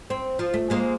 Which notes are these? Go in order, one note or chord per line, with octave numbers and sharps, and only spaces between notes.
C4
F3
A3
G#3 A#3 C5